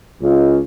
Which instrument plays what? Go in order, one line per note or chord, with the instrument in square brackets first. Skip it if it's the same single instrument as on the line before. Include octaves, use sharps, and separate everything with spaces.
[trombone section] C#2